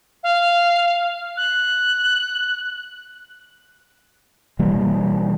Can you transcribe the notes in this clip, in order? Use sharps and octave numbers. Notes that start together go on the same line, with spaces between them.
F5
F#6
B2 E3 G3 A#3